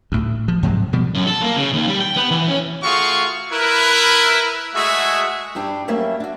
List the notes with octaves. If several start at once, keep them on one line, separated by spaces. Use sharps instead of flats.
D2 A2
F3
G#2 C3 F#3 G#3
B2 F3 G3
F#2
A4
A#3
C#3
D#2
G3
G5
B3
E3
C#4
A3 F4 F#4 G#4 F5 C#6
E4 A#4 B4
G#3 A3 F#4 G#4 E5
G2 G3 D4 G4
F#3 G3 A3 A#3 C#4 E5
D4 F#4